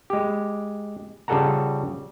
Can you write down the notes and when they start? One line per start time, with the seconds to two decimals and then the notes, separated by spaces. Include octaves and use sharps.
0.10 G#3 G4
1.28 C#3 G3 F4 A4 F#5 A#5